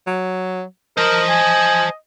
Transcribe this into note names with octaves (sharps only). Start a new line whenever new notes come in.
F#3
A#4 C5 D#5 A5
G#5